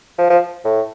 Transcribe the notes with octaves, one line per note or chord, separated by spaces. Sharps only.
F3
F3
A2